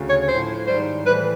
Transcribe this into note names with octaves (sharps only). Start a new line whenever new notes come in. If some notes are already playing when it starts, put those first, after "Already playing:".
Already playing: D2 C#3
C#5
A2 F3 C5
G#2 D#3 G3 C5
A2 E3 G3 B4